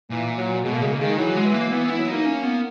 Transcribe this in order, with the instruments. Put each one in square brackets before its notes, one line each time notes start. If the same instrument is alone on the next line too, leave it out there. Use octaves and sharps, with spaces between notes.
[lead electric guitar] A#2 [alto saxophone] E3
[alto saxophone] F#3
[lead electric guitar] B2 [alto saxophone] G#3
[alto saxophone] A#3
[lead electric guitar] C#3 [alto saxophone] G#3
[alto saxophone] A#3
[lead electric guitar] D#3 [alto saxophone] G#3
[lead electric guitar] E3 [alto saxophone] F#3
[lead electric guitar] G#3
[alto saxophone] E3
[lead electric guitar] A#3
[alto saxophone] E3 [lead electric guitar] B3
[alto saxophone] E3
[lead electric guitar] E4
[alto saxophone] F#3
[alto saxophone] A#3 [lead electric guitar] D#4
[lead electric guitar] C#4
B3